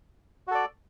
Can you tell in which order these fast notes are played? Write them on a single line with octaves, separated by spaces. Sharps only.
F#4 A4 D5